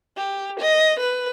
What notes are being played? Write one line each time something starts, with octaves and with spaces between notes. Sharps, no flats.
G4
D#5
B4